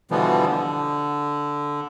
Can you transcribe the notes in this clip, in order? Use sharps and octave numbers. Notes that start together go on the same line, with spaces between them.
B2 D3 E3 F3 G3 B3
D3